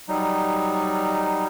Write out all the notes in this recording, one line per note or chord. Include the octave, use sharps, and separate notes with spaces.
F#3 G3 D#4